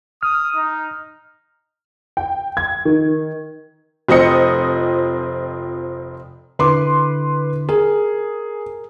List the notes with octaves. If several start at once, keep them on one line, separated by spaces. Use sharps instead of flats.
D#6 F6
D#4
G5
G#6
D#3
F1 F3 C4 D#5 D#6 C#7
D3 E4 B4 C6 D6
G#4 A#4